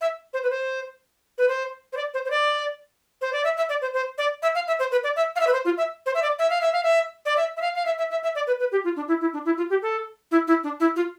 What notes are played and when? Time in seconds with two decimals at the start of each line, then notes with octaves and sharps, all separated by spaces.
0.01 E5
0.34 C5
0.43 B4
0.51 C5
1.38 B4
1.49 C5
1.93 C5
1.97 D5
2.14 C5
2.25 C5
2.30 D5
3.21 C5
3.33 D5
3.44 E5
3.57 E5
3.69 D5
3.82 C5
3.94 C5
4.18 D5
4.42 E5
4.55 F5
4.67 E5
4.79 C5
4.92 B4
5.03 D5
5.16 E5
5.36 F5
5.40 E5
5.47 B4
5.53 C5
5.65 F4
5.78 E5
6.06 C5
6.15 E5
6.22 D5
6.39 E5
6.50 F5
6.61 E5
6.73 F5
6.83 E5
7.26 D5
7.37 E5
7.57 E5
7.61 F5
7.75 F5
7.86 E5
7.98 E5
8.11 E5
8.23 E5
8.35 D5
8.47 B4
8.60 B4
8.72 G4
8.84 F4
8.96 D4
9.08 E4
9.21 E4
9.33 D4
9.45 E4
9.58 F4
9.70 G4
9.82 A4
10.31 E4
10.48 E4
10.64 D4
10.80 E4
10.96 F4